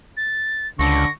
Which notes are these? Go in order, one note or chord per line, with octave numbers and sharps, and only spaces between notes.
A6
C#2 D3 C#6 A#6